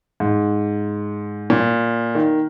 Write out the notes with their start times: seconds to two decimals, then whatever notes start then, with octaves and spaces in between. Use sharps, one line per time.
0.20 G#2
1.50 A#2
2.15 D#3